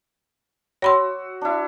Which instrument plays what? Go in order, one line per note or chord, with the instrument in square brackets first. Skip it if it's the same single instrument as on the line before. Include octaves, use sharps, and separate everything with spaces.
[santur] F#4 E5 [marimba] C#5 B5 C6
[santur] D4 E4